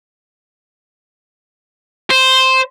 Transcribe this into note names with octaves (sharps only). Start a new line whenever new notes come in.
C5